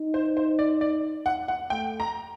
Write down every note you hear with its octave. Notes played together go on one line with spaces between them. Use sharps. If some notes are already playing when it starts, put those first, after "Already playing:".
Already playing: D#4
C5
C5
D5
D5
F#5
F#5
A3 G5
A#5